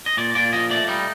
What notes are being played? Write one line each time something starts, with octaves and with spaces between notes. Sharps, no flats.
D#5
A#2 D5
A#2 D5
F3 D#5
A3 D5
G3 D#4